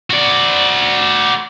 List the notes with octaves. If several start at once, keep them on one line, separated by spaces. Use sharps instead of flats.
F#4 D5